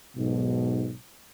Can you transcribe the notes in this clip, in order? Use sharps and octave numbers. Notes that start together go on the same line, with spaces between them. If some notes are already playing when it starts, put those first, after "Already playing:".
B1 G#2 B2